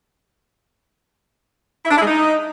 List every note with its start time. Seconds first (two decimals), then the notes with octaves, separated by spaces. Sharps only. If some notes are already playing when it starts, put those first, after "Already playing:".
1.85 E4
1.90 D4
1.95 E4
2.01 G#3
2.06 D#4